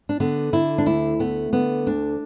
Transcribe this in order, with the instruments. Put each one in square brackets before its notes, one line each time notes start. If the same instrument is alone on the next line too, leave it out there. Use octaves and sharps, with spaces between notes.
[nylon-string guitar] D4
D3 B3
D3 E4
D4
D2 E4
A3 B3
D3 B3
D2 D4